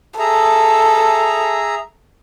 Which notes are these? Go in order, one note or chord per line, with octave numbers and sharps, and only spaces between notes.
G#4 A4 E5 A#5